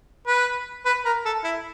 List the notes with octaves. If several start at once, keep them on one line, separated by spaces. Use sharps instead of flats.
B4
B4
A#4
A4
E4